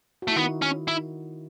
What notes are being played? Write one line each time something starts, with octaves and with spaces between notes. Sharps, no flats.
F#4
A3 E4
D#3 B3 D#4
C#4
E4